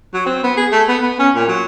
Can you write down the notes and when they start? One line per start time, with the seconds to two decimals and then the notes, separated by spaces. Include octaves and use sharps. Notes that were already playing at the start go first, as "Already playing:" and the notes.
0.14 F#3
0.26 C4
0.44 B3
0.57 G#4
0.72 A3
0.88 B3
1.02 B3
1.19 C#4
1.35 A#2
1.49 F#3